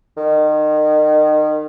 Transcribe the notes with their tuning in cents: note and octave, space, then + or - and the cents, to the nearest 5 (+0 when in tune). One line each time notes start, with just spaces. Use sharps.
D#3 -30